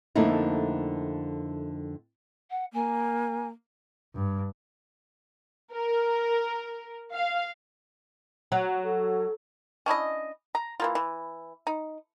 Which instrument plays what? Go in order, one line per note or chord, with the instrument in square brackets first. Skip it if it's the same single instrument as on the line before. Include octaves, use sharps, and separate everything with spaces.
[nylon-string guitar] F2 D3 A3 A#3 D#4 E4
[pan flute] F#5
[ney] A#3 [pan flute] G#5
[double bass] G2
[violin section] A#4
F5
[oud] F#3
[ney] A4
[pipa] C#4 D4 E4 D#5
A#5
E3 A#3 F4
E3
D#4